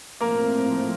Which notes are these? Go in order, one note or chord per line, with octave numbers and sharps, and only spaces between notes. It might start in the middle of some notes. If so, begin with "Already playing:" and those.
A2 F3 A3 A#3 C4 A#4